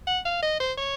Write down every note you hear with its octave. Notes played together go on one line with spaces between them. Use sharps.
F#5
F5
D#5
C5
C#5